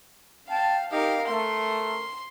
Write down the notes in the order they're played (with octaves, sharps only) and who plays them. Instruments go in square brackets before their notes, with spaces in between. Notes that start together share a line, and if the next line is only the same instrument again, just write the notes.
[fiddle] F5 [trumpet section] G5 A5
[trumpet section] D#4 G4 [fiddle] A#4 F5
[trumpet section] A3 A#4 [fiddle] C6